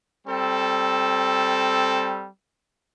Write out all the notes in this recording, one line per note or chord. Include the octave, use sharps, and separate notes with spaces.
G3 C4 A4